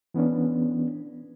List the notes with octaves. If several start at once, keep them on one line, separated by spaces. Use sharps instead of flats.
E3 B3 C#4 D4